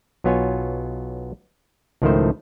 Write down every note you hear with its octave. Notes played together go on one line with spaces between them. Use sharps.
B1 F#3 B3 F4 C#5 G#5
C#2 A2 D#3 F3 A3 C5